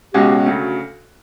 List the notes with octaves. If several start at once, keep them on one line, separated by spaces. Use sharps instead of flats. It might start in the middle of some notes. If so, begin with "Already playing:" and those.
C#2 B2 G#3 C#4 F#4 G4
D2 C#3 F#3